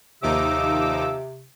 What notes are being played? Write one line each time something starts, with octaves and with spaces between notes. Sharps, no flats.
D#2 C3 F3 D#4 D6 E6